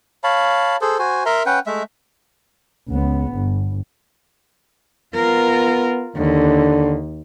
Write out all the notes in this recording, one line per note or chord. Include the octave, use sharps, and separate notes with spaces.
C#5 F5 A5 B5
G#4 A4 C5
F#4 C5 G#5
A#4 E5 A#5 C6
C#4 B4 F#5 G5
G#3 A3 E5
C#2 B3
G1
B3 F4 A#4
D#2 D3